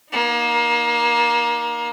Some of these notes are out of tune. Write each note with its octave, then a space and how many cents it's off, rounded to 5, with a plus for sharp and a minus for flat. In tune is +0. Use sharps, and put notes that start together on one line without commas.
A#3 +25 D#4 +0